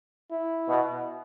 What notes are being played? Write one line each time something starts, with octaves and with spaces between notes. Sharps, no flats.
E4
B2